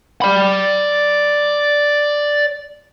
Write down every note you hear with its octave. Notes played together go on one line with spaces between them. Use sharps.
D5 B5